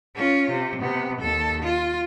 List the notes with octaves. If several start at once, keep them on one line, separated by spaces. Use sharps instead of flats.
C#4 F4
C3
C3 B3
D#2 A4
F4